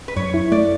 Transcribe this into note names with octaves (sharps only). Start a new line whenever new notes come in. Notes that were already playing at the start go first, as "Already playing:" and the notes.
B4
F#2 C#5
E4
A3 D5